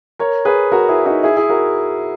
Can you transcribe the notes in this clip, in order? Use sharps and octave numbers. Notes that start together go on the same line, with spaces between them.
A#4 C#5
G#4 B4
F#4 A#4
E4 G#4
D#4 F#4
E4 G#4
E4 G#4
F#4 A#4